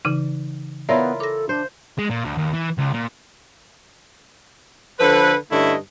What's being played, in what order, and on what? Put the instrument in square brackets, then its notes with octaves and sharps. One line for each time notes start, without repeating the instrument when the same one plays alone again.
[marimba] C#3 E3 D#4
[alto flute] B3 [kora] E4 F4 A#4 [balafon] C#5 D5 E5
[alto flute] A4 [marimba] D6 A#6
[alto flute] D4 [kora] C5
[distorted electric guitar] G#3
A#2
D2
D#2
E3
C#2
A#2
[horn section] D3 F3 A4 B4
G2 D3 A3 C#4 E4 D#5